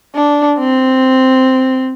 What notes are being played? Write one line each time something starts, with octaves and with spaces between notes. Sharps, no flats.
D4
C4